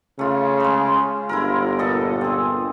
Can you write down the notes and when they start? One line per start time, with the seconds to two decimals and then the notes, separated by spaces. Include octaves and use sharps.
0.19 C#3 A3 F4
0.60 G#3 C5
1.29 G1 E4 F4 A#4
1.79 A#2 A4 D#5
2.21 C4 G#4